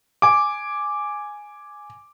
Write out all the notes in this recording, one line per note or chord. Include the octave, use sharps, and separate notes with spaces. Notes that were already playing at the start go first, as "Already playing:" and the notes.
G#5 D6